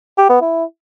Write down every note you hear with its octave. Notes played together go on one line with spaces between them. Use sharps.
G4
B3
E4